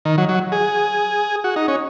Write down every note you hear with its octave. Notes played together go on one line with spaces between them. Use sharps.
D#3
F#3
F#3
G#4
F#4
D#4
C#4